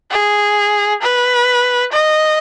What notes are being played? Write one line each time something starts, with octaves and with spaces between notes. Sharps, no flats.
G#4
B4
D#5